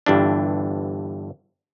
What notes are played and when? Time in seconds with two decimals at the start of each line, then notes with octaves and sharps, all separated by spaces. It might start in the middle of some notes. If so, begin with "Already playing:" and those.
0.06 G1 G2 E3 D4